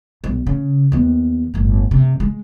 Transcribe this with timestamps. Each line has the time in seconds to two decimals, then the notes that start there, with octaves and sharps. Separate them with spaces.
0.24 B1
0.47 C#3
0.92 D#2 B3
1.54 G1 A2
1.91 C3
2.20 G#3